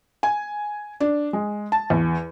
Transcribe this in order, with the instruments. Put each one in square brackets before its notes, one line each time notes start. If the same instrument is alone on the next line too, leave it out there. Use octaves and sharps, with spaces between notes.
[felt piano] G#5
D4
G#3
A5
E2